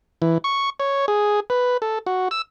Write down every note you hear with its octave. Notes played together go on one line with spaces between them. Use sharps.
E3
C#6
C#5
G#4
B4
A4
F#4
E6